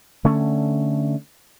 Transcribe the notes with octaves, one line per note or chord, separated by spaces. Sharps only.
D3 A3 C#4